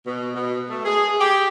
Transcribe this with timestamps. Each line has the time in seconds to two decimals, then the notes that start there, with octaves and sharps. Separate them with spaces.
0.07 B2
0.35 B2
0.70 A3
0.85 G#4
1.20 G4